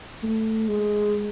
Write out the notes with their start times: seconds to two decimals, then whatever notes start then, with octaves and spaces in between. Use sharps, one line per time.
0.23 A3
0.68 G#3